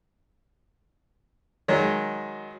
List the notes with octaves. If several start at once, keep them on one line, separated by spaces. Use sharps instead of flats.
D#3 F#3 G#3